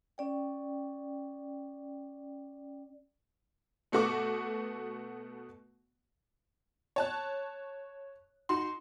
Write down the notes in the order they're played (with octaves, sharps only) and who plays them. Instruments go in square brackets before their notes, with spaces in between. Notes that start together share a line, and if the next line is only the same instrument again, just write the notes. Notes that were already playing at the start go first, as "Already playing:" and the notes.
[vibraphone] C#4 D5 G5
[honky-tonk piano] B2 A3 B3 F#4 C#6 D6
C#5 A5 F#6
D#4 F#4 C6